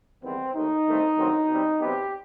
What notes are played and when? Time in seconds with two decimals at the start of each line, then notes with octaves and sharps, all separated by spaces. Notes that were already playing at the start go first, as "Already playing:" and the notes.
0.23 E2 D#3 G3 B3 C4
0.55 D#2 D#3 A3 D#4
0.86 G2 D#3 A3 C4
1.17 G2 D#3 F#3 A3 C4
1.49 B2 G3 C4
1.81 E2 C3 F#3 B3 G4